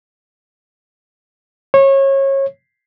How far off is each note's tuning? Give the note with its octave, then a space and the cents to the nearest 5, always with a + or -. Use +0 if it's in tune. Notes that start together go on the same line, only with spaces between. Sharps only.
C#5 -25